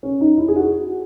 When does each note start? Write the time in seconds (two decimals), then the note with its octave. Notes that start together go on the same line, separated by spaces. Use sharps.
0.03 C#4
0.21 D#4
0.38 E4
0.48 G#4
0.56 F#4